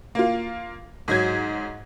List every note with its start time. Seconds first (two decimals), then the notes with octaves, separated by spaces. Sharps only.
0.15 A#3 F4
1.08 G#2 F#3 G#6